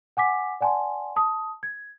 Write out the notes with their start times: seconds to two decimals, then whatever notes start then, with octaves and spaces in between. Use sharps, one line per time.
0.17 F#5 G#5 D6 B6
0.61 D5 F#5 G#5 A5 C6
1.16 A5 D#6
1.63 G#6